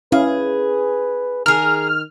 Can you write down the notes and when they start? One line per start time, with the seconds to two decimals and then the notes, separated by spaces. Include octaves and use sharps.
0.12 C#4 E4 G#4 B4 F5
1.46 D#3 G#4 A#4 F6